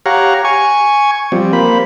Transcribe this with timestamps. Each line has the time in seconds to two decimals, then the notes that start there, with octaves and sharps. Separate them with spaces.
0.06 G4 C#5 F5 F#5 A#5
0.45 G#5 C#6
1.32 F3 G3 C4
1.53 A#3 C5 B5